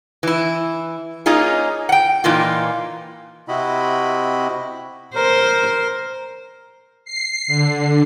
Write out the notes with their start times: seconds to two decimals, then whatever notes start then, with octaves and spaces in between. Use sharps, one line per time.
0.23 E3 E4
1.26 A#3 C#4 D#4 F4 G#4
1.89 F#5 G5
2.24 A#2 E3 A#3 D#4 F4
3.48 C3 C4 E4 F#4 D#5 B5
5.15 A#4 C5
7.05 C7
7.47 D3